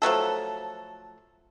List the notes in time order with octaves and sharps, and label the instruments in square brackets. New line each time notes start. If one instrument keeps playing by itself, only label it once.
[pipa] F3 F#3 A3 A4